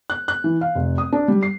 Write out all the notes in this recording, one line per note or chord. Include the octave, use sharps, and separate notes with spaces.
F#6
F#6
E3
F5
F1
D#6
D4
G3
C7